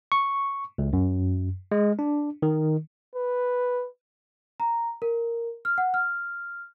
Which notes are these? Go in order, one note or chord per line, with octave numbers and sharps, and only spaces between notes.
C#6
C#2
F#2
G#3
D4
D#3
B4
A#5
A#4
F6
F#5
F6